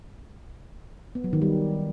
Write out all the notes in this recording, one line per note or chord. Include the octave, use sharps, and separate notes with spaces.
B3
F#3
D#3
G3